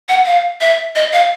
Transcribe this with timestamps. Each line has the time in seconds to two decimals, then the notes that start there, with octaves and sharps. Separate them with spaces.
0.09 F#5
0.26 F5
0.61 E5
0.95 D#5
1.13 F5